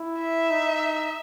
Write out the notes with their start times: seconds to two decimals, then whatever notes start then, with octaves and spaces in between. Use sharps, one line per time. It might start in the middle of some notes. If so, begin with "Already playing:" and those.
Already playing: E4
0.21 E5
0.50 D#4